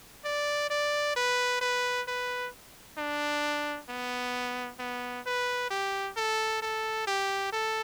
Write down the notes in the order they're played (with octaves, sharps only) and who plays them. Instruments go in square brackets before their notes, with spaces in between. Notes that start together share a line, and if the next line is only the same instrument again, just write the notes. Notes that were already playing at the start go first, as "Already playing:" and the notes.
[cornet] D5
D5
B4
B4
B4
D4
B3
B3
B4
G4
A4
A4
G4
A4